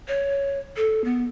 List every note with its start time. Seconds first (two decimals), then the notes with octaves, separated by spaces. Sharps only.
0.08 C#5
0.77 A4
1.04 B3